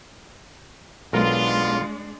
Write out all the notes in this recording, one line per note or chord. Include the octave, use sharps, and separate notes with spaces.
B1 G#3 B3 D4 F4 A#4